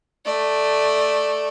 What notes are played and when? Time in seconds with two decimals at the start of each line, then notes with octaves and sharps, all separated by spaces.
0.25 A3 D5